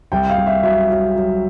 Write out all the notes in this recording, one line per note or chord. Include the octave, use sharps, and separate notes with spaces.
C2 G5
F5
C2
E5
F#3 E5
F#3
F#3